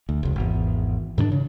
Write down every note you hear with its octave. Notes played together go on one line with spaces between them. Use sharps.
D2
F1 C#2
G#1 E2
G#2 D#3 C#4 D4
C#3